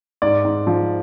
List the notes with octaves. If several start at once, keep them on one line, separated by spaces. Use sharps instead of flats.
G#2 D5
G#2
F3